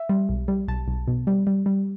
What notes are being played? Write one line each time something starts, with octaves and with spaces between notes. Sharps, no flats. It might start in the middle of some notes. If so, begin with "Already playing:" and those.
Already playing: E5
G3
B1
G3
B1 A5
B1
B2
G3
G3
G3